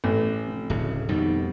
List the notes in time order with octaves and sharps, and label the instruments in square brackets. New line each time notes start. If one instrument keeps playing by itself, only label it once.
[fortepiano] A1
[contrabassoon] F1
[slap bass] D1 C#3
[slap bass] F2 B2 G3 [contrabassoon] D#3